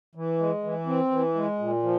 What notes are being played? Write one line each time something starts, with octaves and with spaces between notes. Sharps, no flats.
E3
G#3
E3
C4
E3
G#3
A#2
F3